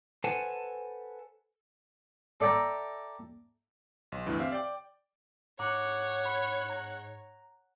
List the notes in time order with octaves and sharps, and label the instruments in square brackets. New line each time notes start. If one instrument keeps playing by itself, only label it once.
[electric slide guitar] A4 B4 C5 F#5 G#5 A5
[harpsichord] A4 D5 E5 G5 A#5
[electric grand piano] B1
D2 G2 E3
C4 G4 E5 F5
D5 G5
[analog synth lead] G#2 [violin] C#5 [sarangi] F#5 [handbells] A#5 D6
[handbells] B5
A#5